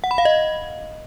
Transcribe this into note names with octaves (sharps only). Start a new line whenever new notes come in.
F#5
B5
F5
D#5